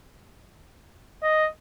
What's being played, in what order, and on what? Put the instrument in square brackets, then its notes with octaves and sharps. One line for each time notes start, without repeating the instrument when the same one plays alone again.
[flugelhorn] D#5